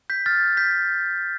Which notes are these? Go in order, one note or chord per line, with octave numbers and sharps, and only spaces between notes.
G6 B6
F6 A6
G6 B6